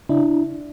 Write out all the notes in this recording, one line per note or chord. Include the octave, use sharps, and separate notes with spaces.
C#3 D4 E4